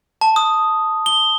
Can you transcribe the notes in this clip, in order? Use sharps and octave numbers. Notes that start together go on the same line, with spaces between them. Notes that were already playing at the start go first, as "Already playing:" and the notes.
A5
D#6
G7